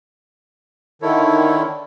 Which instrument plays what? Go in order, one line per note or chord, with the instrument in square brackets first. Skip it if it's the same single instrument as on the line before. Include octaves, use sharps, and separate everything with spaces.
[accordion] D3 D#3 [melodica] E4 A4 C#5